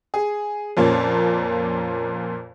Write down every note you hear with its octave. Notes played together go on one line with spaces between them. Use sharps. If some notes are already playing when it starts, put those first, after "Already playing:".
G#4
F2 A#2 A#3 C#4